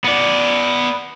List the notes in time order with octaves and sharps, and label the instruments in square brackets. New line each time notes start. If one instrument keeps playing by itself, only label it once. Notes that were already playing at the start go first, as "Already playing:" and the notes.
[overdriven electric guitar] B3 D5